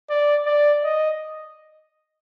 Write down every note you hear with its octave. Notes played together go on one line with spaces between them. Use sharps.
D5
D5
D#5